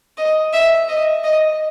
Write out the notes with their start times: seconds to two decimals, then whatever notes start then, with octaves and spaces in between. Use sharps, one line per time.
0.18 D#5
0.53 E5
0.88 D#5
1.24 D#5